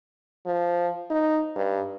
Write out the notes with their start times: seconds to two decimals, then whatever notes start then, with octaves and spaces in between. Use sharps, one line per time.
0.46 F3
1.11 D#4
1.56 G2